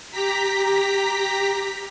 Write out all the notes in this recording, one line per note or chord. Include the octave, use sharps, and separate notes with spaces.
G4 A#5 B6